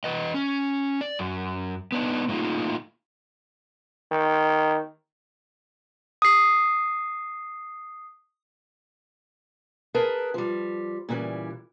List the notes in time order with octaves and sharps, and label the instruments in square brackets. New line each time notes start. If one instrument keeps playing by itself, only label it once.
[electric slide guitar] E3 B4 D#5
C#4
D5
F#2
B3 D4 D#4
A2 A3 A#3 D#4 F4
[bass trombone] D#3
[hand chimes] D#6 C7
[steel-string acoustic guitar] G#4 A#4 B4 A5
F3 G3
A#2 C#3 E3 G3